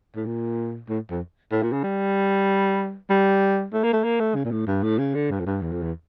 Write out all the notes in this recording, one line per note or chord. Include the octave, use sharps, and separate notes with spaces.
A2
A#2
A2
F2
A2
A#2
C#3
G3
G3
A3
A#3
A3
A#3
A3
C#3
A#2
A2
G2
A2
C#3
D3
G2
F2
G2
E2
F2
E2